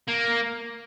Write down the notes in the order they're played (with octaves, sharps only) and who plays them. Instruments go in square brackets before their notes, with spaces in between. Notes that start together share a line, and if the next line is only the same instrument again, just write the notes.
[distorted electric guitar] A#3